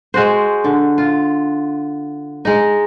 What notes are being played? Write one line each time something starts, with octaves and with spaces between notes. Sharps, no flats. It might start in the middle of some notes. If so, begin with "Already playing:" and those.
G#3 F#4 C5
D3
F4
G#3 D#4